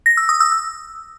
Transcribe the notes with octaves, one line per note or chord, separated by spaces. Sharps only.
A#6
E6
D#6
E6
E6